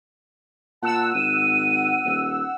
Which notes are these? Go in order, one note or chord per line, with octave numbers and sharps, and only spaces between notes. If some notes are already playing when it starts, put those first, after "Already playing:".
A#2 F#5 A5 E6
G#1 D#7
D#1